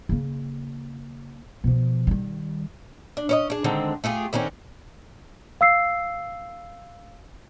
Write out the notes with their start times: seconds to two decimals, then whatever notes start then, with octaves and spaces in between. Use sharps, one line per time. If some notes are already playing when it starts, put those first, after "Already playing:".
0.09 C#3 A#3
1.64 B2 F3
2.07 D#3 G3
3.17 D4
3.29 C#4 C#5 D#5
3.50 D4 G#4
3.64 D3 D#3 G#3 C4
4.04 A3 F4 G4 G#4
4.33 D3 D#3 C4 C#4
5.61 F5 E6 C7